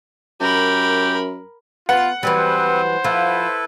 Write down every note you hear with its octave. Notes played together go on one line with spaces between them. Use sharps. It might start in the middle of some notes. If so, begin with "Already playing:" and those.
F#2 G4 A#4 B5
B3 F4 F#5
E3 F#3 G3 C4 B4 C5
F3 E4 F4 A4 B4